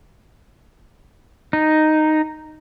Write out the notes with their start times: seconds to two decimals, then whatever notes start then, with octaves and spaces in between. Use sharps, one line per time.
1.53 D#4